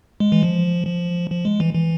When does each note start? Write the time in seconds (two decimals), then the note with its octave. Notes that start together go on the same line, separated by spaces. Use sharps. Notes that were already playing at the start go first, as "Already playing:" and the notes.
0.20 G#3
0.32 E3
0.43 F3
0.87 F3
1.31 F3
1.45 G#3
1.60 E3
1.75 E3